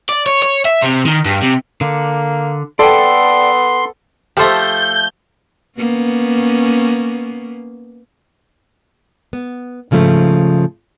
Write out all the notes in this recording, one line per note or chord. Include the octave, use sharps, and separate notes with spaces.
D5
C#5
C#5
E5
C3
D#3
G2
C3
D3 A#3
B3 A4 D5 G5 C6
F3 A3 G4 A4 C5 G6
A#3 B3 C#4
B3
G#2 C#3 F3 G3 A3